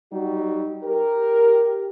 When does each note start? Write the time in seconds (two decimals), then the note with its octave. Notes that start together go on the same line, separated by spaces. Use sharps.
0.12 F#3 G3 D#4 F#4
0.84 G4 A#4